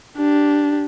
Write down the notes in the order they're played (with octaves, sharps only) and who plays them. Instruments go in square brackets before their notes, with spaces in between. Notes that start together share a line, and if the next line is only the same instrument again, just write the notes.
[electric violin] D4 G4